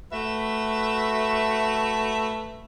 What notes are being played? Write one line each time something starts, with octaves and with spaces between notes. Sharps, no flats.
A3 F#4 B4 E5